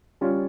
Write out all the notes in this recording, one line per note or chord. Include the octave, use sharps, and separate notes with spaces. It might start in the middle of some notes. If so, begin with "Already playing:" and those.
G3 C#4 F4